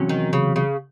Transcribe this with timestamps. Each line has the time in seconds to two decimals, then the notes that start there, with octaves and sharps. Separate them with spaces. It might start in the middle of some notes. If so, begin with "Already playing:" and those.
Already playing: E2 C3 F#3 C#4
0.09 D#3
0.33 C#3
0.56 C#3